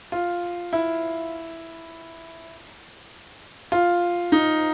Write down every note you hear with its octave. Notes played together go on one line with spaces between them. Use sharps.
F4
E4
F4
D#4